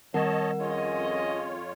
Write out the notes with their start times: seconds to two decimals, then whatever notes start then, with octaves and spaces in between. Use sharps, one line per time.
0.14 D#3 G3 C4 A#4 C#5 D#5 F#5 A5
0.60 F2 C#4 F4 G#4 C#5 D#5